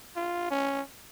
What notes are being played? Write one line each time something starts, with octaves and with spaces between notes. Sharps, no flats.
F4
C#4